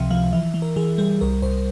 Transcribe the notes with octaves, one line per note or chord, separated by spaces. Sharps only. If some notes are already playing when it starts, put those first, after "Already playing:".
Already playing: C#2 C3 F3 E5 F5 G5
F3 F5
E3 E5
E3
A#4
E3 G#4
G3 G#4
C2 A#4
C2 C5